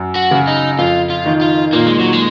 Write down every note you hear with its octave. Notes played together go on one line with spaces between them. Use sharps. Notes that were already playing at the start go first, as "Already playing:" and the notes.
Already playing: F#2
F#4
C#3
D#4
F2 F4
F4
D#3
F4
A#2 A#3
G#3
F#3
G#3